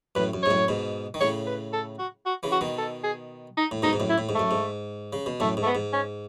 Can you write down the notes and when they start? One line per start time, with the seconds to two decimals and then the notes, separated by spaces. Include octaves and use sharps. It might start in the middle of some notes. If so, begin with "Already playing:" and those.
0.15 F#2 A2 B4
0.34 F#2
0.43 G#2 C#5
0.51 F#2 A2
0.68 G#2 B2
1.14 D#3
1.20 A2 C#3 C#5
1.47 B4
1.73 A4
1.99 F#4
2.26 F#4
2.43 C#3 E3
2.52 F#4
2.61 B2 D#3
2.78 A4
3.04 G#4
3.57 D#4
3.71 A2
3.82 G#2 B2 D#4
3.93 G#2
4.00 F#2 A2
4.10 E4
4.18 A2
4.29 G#2
4.35 F#2 A3
4.51 G#2
5.13 C#3
5.26 B2
5.40 F#2 A2 A3
5.57 G#2
5.63 A3
5.66 B3
5.75 G#2
5.93 C#4